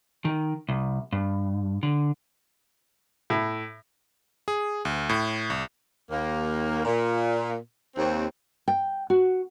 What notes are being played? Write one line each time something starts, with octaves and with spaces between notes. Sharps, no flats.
D#3
C2
G2
D3
A2
G#4
D2
A2
C2
D#2 A#3
A#2
D#2 C4
G5
F#4